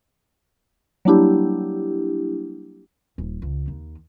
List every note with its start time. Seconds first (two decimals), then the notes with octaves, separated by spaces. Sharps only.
1.05 F#3 G3 A#3 D4 E4 G4
3.18 D#1
3.42 C#2
3.68 D#2